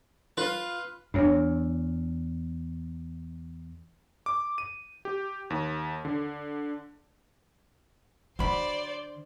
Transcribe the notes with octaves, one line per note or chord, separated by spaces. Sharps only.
F4 B4
E2 D4 C#5
D6
D#7
G4
D#2
D3
D3 F#3 C5 D5 B5